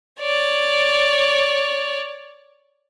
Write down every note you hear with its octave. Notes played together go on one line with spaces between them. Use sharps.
C#5 D5